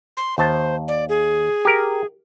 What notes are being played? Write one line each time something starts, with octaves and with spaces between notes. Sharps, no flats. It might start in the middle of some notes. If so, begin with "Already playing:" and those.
C6
D#2 C5 A5
D5
G#4
G4 A#4